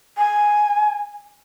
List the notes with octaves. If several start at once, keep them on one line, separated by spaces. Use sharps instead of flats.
G#5